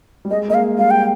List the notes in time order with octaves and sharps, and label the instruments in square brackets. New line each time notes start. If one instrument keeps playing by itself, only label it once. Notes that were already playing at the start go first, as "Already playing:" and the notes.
[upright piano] G3
[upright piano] G#3 [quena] D#5
[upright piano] A#3 [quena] D#5
[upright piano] G#3 [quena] F5
[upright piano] G3 [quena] F5
[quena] G5